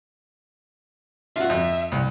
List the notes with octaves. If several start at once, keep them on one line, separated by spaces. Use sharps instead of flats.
F4 F#4 E5
F2
C2